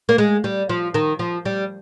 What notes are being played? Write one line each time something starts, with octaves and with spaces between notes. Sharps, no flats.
A#3
G#3
G3
F3
D#3
F3
G3